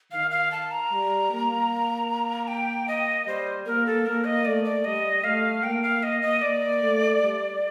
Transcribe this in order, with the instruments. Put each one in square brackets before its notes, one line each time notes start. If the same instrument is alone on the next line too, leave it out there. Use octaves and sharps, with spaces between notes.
[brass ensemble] D#3 [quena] F5
[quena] F5
A5
A#5
[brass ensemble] G3
A#3
[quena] G5
D#5
[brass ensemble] G3 [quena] C5
[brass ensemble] A#3 [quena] A#4
[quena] A4
[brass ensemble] A#3 [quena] A#4
[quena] D#5
[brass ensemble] A3 [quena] D5
[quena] D5
[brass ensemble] G3 [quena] D#5
[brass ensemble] A3 [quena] F5
[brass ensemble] A#3 [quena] G5
[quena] F5
[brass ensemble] A#3 [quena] D#5
[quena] D#5
[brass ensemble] A#3 [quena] D5
[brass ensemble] A3
G3